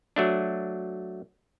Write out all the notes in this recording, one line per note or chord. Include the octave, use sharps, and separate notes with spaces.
F#3 A3 D4